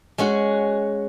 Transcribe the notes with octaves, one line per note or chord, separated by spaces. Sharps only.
G#3 C#4 F#4